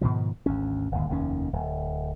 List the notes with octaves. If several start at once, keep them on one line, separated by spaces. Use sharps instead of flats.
G#2 B2 D#3 F3
G#1 D2 C#4
D1 G1 D#2
F1 D#2 D#3 C#4
D1